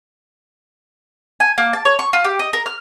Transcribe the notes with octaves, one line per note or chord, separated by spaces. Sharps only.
G#5
A#3
A5
C#5
C#6
F4
G4
D#5
A#4
F6